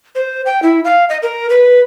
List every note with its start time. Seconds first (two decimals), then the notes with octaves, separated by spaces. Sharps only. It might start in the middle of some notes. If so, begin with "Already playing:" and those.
0.15 C5
0.46 G5
0.62 E4
0.84 F5
1.09 D#5
1.23 A#4
1.50 B4